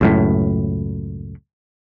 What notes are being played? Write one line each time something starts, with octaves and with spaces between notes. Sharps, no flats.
C#2 F#2 A2